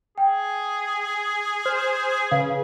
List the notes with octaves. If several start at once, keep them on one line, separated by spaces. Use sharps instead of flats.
G#4 G5
C5 F6
C#3 B4 F5